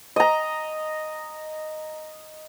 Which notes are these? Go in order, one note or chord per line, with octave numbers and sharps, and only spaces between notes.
D#5 A#5